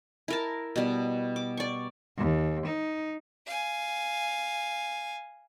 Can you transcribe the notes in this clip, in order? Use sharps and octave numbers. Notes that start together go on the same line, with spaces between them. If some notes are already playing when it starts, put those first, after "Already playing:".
E4 A#4 A5
B2 G3
D6
D5 C#6
D#2
D#4
F5 G#5